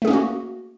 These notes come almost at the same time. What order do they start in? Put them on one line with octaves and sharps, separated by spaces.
A3 G#4 C#4 A#3 F#4